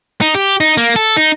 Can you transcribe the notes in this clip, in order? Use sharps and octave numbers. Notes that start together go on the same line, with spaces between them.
D#4
G4
D#4
A#3
A4
D#4